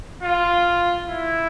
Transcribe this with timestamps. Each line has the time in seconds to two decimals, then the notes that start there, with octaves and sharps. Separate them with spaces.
0.23 F4
1.05 E4